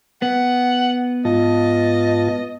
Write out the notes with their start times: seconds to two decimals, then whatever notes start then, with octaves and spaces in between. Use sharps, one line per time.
0.22 B3 F#5
1.25 G#2 F4 D#5 A5